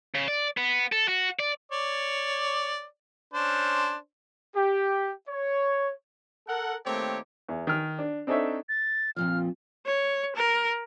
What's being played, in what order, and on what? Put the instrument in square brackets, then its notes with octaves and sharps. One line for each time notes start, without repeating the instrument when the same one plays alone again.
[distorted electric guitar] C#3
D5
B3
A4
F#4
D5
[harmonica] C#5 D5
C#4 D4 C5
[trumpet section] G4
C#5
[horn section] A4 A#4 F#5
D#3 A3 A#3 C4 G4 C#5
[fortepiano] E2
D#3 F6
D4
C4 D4 D#4 A4 C#5 E5
[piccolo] A6
[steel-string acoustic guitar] F2 A#2 F3 [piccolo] F6
[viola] C#5
A#4